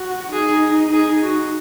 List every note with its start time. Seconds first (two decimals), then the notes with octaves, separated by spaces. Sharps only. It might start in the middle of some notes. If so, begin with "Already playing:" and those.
Already playing: F#4
0.33 D#4 G#4
0.93 G#4
1.23 F#4